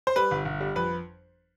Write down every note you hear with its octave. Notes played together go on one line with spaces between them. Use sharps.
C5
G3 B4
G1
G1
G3
F2 B4